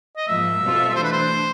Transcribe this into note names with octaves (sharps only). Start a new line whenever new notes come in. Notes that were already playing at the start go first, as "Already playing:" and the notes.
D#5
G#2 F3 A#3 E5
B2 G3 C4 F4 A4
E3 A3 D4 C5
B4
C5